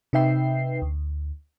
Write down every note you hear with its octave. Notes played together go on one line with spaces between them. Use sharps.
C3 D#4 B4 E5 G5 C7
D2